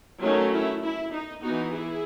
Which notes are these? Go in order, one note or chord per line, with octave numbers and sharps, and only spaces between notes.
D#3 F#3 A3 C#4 D#4
E4
E4
D#4
E3 B3 D#4 F#4
E4 G#4